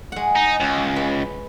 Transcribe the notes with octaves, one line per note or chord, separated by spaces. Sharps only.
G#3 F#5
D#4
C#2
B4